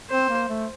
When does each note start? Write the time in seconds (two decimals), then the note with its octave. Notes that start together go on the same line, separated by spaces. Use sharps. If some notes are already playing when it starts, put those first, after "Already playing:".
0.10 C4 C5
0.29 A#3
0.49 A3